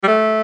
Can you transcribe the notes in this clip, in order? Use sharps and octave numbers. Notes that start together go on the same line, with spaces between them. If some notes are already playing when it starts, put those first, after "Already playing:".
G3
A3